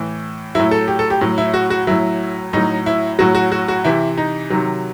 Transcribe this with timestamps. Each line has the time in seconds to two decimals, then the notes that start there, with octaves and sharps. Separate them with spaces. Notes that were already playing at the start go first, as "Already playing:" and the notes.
Already playing: A2 E3
0.55 A2 F#3 E4
0.71 A4
0.88 G4
0.99 A4
1.10 G4
1.21 A2 F#3
1.38 E4
1.54 F#4
1.70 F#4
1.87 A2 F#3 E4
2.53 A2 F#3 D#4
2.86 E4
3.19 A2 F#3 F#4
3.35 F#4
3.52 F#4
3.68 F#4
3.84 C3 E3 E4
4.17 D#4
4.50 C3 D#3 F#3